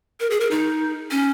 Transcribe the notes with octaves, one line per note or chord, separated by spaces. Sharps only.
A#4
G#4
A#4
D#4
C#4